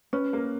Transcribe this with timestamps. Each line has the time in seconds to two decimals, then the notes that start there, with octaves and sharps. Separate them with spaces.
0.13 C#4 B4
0.33 A#3